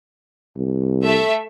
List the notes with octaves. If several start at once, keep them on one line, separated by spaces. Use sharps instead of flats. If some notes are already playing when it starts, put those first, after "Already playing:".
C2
A3 E5